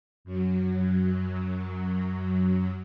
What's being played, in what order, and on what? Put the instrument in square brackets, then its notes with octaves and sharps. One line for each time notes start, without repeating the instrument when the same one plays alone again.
[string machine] F#2 F#3